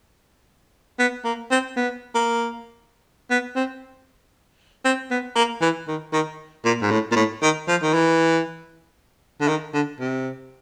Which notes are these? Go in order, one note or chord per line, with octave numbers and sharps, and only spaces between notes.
B3
A#3
C4
B3
A#3
B3
C4
C4
B3
A#3
E3
D#3
D#3
A#2
G#2
A2
A#2
A2
D#3
F3
D#3
E3
D3
D#3
D3
C3